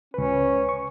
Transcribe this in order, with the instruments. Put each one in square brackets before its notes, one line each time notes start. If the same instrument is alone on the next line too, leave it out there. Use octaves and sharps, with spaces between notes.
[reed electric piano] C#2 B4 [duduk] C#4
[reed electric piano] C#6